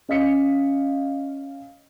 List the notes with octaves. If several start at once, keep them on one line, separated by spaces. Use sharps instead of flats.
C#4 D#5 F5 B6 C#7